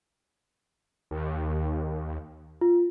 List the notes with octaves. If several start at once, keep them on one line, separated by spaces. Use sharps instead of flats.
D#2
F4